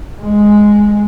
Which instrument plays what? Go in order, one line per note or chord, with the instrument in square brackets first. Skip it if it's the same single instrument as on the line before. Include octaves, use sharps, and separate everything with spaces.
[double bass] G#3